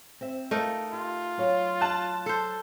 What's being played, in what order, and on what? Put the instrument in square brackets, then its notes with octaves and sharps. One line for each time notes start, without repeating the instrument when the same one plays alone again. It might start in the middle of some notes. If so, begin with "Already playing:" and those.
[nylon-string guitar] C4 C5 E5
[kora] A3 D#4 A#4 [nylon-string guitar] F4 D#5
[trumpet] F4 [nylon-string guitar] G4
[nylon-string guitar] F#3 C#5 F5
[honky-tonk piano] A5 F#6
[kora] A4 C5